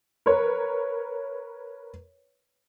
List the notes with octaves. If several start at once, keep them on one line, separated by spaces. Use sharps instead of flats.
A#4 B4 C#5